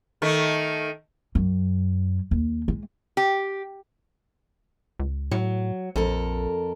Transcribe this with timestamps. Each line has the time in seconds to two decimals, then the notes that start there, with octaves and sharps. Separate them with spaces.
0.22 D#3 A3
1.35 F#2
2.31 D#2
2.68 G#3
3.17 G4
4.99 C#2
5.31 A2 F#3
5.96 A#1 F2 A4 A#4